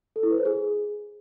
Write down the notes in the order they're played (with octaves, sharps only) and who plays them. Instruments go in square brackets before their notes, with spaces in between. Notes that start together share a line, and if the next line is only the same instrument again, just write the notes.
[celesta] A4
E4
B4
C5
G#4